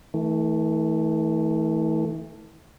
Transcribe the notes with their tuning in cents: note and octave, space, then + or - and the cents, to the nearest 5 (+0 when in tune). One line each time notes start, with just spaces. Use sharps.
E3 -40 A3 +0